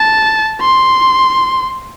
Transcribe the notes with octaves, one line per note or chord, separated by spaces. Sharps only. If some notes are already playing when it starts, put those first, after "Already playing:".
Already playing: A5
C6